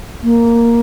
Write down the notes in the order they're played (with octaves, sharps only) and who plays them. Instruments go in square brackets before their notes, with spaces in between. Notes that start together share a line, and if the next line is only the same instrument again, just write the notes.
[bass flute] A#3